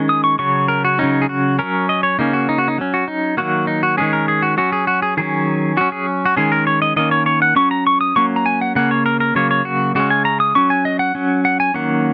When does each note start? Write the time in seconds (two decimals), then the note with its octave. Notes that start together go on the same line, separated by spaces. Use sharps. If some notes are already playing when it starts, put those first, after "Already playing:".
Already playing: D#3 G#3 C#4
0.09 D#6
0.24 C#6
0.39 C#3 F#3 C#4 C#6
0.68 A#4
0.85 F#4
0.99 C#3 F#3 C#4 D#4
1.22 G#4
1.29 F#4
1.59 F#3 C#4 A#4
1.89 D#5
2.03 C#5
2.19 C#3 A#3 C#4 D#4
2.33 F#4
2.49 D#4
2.58 F#4
2.68 D#4
2.78 F#3 C#4
2.94 F#4
3.08 D#4
3.37 D#3 F#3 A#3 F#4
3.67 D#4
3.83 F#4
3.97 D#3 G#3 C#4 G#4
4.13 A#4
4.28 G#4
4.42 F#4
4.57 F#3 C#4 F#4
4.73 G#4
4.87 F#4
5.02 G#4
5.17 D#3 F#3 C#4 G#4
5.77 F#3 C#4 F#4
5.92 G#4
6.26 F#4
6.37 D#3 G#3 C#4 G#4
6.52 A#4
6.67 C#5
6.82 D#5
6.96 D#3 A#3 C#4 D#5
7.11 C#5
7.26 C#5
7.42 F#5
7.56 F#3 C#4 C#6
7.71 A#5
7.87 C#6
8.01 D#6
8.16 F#3 A#3 C#4 C#6
8.36 A#5
8.46 G#5
8.61 F#5
8.75 C#3 A#3 C#4 F#5
8.91 C#5
9.06 A#4
9.20 A#4
9.35 C#3 F#3 A#3 C#5
9.51 C#5
9.65 F#4
9.95 C#3 G#3 C#4 F#4
10.10 G#5
10.25 A#5
10.40 D#6
10.55 F#3 C#4 C#6
10.70 G#5
10.85 D#5
10.99 F#5
11.15 F#3 C#4
11.45 F#5
11.60 G#5
11.74 D#3 F#3 A#3 C#4 F#5